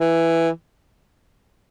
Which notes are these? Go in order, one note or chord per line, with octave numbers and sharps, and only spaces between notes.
E3